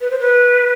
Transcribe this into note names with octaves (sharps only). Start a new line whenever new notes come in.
B4
C5
B4